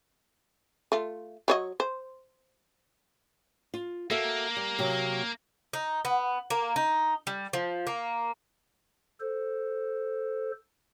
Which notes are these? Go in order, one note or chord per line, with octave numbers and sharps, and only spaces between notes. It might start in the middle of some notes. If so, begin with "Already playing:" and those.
A3 F4
F#3 C#5 D#5
C5
F4
A#3 F#4 A4 E5
G3
C3 F#3
D#4
B3
A#3
D#4
G3
F3
A#3
A4 C5